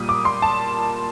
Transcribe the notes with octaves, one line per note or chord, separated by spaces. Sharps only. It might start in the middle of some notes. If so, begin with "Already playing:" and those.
Already playing: A#2 G3 A#3 D#6
D6
C6
A5